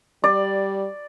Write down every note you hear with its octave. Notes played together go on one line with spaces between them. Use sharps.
G3 D5